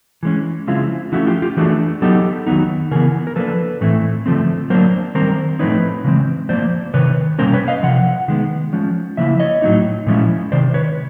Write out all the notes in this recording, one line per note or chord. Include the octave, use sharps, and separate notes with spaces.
E3 G#3 C#4
C#3 F3 G#3 C4 E4 F4
D3 F3 A3 C#4 E4 F#4
F4 G4
F4 G4
E3 A3 D4 F#4 G#4
F#3 B3 D#4 G4 A4
D#3 F#3 B3 D#4
C#3 E3 B3 G#4 A#4
A#4
F3 A#3 D4 A4 B4
A2 E3 A3 C4 E4
D3 F3 A3 C4
F#3 A#3 D4 A#4 C5
D#3 G3 C4 A#4 C5
A2 F3 A3 C4 D#4 B4 C#5
C#3 E3 G#3 C4
A2 F3 A#3 C5 D5
C3 D#3 B4 C#5
B2 G3 A#3 C#4 A#4 C5
B4 C#5
D#5 F5
C3 F3 F#5
D#3 G#3 B3
F3 G#3 C#4
C#3 F3 A#3 E4 E5
C#5 D#5
A2 F#3 A#3 D#4
A#2 F3 G#3 C#4 E4
C3 D#3 C5 D5
B4 C#5